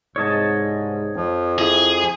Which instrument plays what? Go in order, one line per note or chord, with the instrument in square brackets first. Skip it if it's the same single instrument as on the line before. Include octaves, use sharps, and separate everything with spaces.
[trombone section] C2 G#2 [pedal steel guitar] C#5 D#5 A5
[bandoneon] F2 F3
[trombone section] E4 [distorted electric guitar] G#4